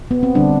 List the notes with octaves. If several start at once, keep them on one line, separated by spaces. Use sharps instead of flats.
B3
C4
D3 G3 D4